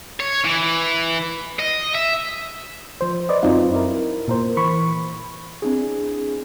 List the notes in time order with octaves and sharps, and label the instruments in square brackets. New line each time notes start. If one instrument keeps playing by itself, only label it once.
[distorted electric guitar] C#5
E3
D#5
E5
[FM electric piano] F3 C5
B4 D5 D#5
F#2 F#3 C4 D#4 F4
E4 A#4
A#2 A#4 C5
E3 B5 C#6
[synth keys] C4 D4 E4 G#4